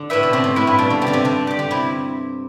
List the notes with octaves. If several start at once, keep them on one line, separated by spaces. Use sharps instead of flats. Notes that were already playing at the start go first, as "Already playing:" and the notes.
Already playing: D3
A2 E4 B4 E5
B2
C3 C4
A2
A2 E4 B4 E5
G2
B2 D4
D3
C3 G4
D3 D5
C3
D3 D4
G4 D5
D3
C3 E4